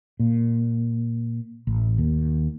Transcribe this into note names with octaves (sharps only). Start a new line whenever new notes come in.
A#2
A1
D#2